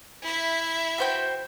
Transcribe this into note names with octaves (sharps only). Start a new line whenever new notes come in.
E4 E5
F#4 C5 G5